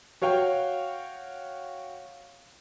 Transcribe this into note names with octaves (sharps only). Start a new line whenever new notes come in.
F#4 C#5 F5 G5